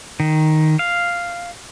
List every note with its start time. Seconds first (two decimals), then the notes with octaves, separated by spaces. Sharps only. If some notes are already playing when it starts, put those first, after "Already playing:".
0.20 D#3
0.79 F5